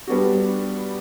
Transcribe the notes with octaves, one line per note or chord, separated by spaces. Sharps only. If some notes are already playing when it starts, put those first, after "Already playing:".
G3 B3 D4 F#4